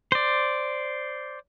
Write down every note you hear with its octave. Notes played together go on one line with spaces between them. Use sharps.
C5 D5